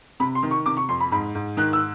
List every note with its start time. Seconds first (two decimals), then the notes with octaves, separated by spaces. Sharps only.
0.20 C3 B5
0.35 C6
0.43 D#3
0.51 C#6
0.66 C3 D6
0.77 C#6
0.89 F2 C6
1.00 B5
1.11 G#2 B5
1.35 G#2
1.57 D#3 F#6
1.73 E6